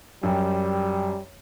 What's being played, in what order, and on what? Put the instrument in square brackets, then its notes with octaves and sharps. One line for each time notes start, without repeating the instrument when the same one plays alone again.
[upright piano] F#2 G5 [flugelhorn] G3